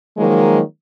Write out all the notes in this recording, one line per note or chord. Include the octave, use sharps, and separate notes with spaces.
D#3 F3 F#3 G#3 A#3